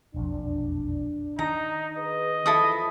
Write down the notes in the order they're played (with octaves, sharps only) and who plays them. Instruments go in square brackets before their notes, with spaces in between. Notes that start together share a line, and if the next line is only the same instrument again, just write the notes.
[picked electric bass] E1 A#1 F2 [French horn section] D4
[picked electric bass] D#3 [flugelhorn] D#4 [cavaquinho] A#5
[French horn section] G#4 B4 [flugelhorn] D#5
[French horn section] E2 E3 F3 [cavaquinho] E4 A4 D#6